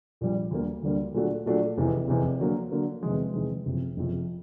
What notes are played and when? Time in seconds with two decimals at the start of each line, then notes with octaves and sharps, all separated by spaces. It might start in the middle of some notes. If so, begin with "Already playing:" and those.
0.21 A#1 A#2 G3
0.51 D2 D3 G3 A#3
0.83 D2 D3 G3 A#3
1.14 A#2 F#3 A3 D4 F#4
1.46 A#2 F#3 A3 D4 F#4
1.77 F1 E2 C3 E3
2.08 F1 E2 C3 E3
2.40 D3 F#3 A#3
2.71 D3 F#3 A#3
3.03 E2 C3 D#3 G#3
3.34 E2 C3 D#3 G#3
3.65 F#1 F2 C3
3.97 F#1 F2 C3